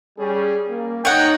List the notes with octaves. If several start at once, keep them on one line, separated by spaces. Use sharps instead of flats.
G3 C#4 G#4
A#3
D#4 C#5 F#5 G5